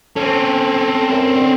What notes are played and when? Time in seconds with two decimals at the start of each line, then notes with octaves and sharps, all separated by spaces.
0.16 C4 C#4 A4
1.11 F#2
1.36 D3